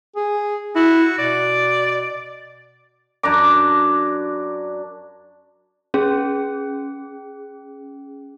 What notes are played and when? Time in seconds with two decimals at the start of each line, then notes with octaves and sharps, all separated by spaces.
0.16 G#4
0.75 E4 F#4
1.18 B2 D5
3.23 F#2 D4 A#5 D6
5.94 C#4 G#4